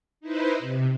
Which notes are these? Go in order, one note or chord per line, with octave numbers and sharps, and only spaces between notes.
D#4 E4 B4 C5
C3